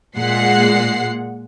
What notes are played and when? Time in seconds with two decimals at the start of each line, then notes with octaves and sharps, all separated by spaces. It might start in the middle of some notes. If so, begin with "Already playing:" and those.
0.18 A#2 G#3 F#5 C7